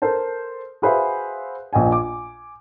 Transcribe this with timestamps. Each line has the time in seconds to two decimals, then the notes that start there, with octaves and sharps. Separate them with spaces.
0.02 A4 A#4 C5 A5
0.82 F#4 G#4 B4 C5 E5 F5
1.73 A#1 D#5 G5 G#5
1.91 G#5 D6